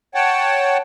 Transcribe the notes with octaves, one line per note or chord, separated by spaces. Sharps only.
C#5 F#5 G5 A5